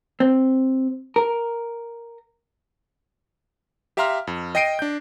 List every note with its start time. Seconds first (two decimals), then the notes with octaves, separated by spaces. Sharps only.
0.20 C4
1.16 A#4
3.97 G4 E5 F5 A#5 C6 F6
4.27 F2
4.55 D#5 G5 A#6 C7 D7 D#7
4.79 D4 G6